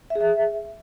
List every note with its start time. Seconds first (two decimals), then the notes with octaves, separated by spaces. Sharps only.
0.10 E5
0.15 G#4
0.21 E5